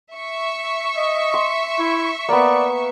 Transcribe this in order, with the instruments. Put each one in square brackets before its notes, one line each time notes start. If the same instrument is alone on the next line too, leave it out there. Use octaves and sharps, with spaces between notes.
[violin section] E5 C#6
[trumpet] D#5
[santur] C6
[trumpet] E4
[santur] A#3 B3 [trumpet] D5